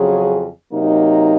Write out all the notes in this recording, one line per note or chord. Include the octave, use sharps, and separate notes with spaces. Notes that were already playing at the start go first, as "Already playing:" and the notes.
Already playing: F2 C#3 F#3 C#4 G#4
C3 F#3 A#3 D#4